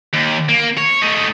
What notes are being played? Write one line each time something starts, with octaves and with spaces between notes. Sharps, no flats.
D#2
A#3
C#5
A3 D#4